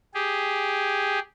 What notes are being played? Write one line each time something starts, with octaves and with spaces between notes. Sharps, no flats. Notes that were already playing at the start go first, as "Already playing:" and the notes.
G4 G#4